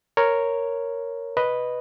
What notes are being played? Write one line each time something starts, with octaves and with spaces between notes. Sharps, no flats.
A#4 C#5
B4 D#5